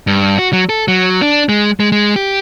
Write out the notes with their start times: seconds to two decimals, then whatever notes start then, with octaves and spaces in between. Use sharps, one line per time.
0.07 G2
0.38 F#4
0.53 F#3
0.69 A4
0.88 F#3
1.22 D4
1.49 G#3
1.80 G#3
1.92 G#3
2.16 G4